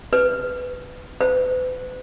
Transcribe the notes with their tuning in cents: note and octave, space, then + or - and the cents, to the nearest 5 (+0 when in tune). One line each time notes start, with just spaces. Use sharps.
B4 +15
B4 +40